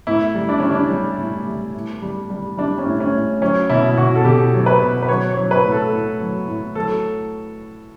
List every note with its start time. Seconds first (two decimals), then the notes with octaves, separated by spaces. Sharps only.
0.07 A2 E4
0.35 G3
0.49 D4
0.59 G3 C#4
0.71 D4
0.90 G3
1.19 A2
1.47 G3
1.75 A2
2.02 G3
2.30 G3
2.57 G3 D4
2.78 C#4
2.86 A2
3.00 C#4
3.13 A2
3.42 F#3 C#4
3.70 B2 E4
3.98 B2 F#4
4.15 A4
4.25 B2 G4
4.53 F#3
4.66 B4
4.80 B2
5.02 B4
5.09 F#3 C#5
5.29 C#5
5.37 F#3
5.51 B4
5.65 A2
5.72 A4
5.93 A2
6.20 F#3
6.47 A2
6.75 F#3 A4